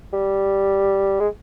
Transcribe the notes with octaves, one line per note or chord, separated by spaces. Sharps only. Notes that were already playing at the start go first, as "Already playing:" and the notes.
G3
G#3